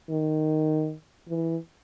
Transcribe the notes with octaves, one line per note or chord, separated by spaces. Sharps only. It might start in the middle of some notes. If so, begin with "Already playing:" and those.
D#3
E3